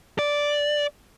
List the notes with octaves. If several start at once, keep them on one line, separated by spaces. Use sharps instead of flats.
D5